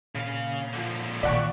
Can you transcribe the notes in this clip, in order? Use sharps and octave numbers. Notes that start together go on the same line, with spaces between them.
A#2 C#3 F5
D3 F3
A#2 D#3 D5 E5 F#5 G5 C#6